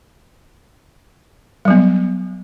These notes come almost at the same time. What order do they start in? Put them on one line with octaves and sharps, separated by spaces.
G3 F#3 B3